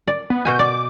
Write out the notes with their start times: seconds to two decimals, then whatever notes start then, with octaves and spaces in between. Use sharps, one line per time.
0.07 D5
0.30 B3
0.45 B2 F#4 G#5 G6
0.59 D5 D6